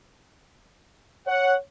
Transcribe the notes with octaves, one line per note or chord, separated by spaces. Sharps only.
C#5 F#5